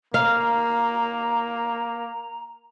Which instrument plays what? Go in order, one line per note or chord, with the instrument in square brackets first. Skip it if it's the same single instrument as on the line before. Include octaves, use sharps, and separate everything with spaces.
[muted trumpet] A#3 [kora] F5 [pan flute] A#5